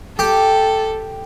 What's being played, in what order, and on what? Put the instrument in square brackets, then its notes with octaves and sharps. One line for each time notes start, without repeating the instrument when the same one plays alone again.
[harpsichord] G4 [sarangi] A4